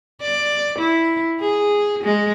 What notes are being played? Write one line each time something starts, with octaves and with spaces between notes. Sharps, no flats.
D5
E4
G#4
G#3